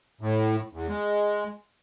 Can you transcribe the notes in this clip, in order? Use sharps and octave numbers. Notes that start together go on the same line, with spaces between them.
A2
E2
G#3